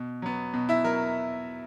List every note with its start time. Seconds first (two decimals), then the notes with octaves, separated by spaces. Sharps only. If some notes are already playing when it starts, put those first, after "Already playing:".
Already playing: B2
0.22 F#3 B3
0.54 B2
0.69 E4 E5
0.84 F#3 A#4